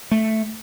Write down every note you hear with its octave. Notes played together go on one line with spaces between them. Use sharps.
A3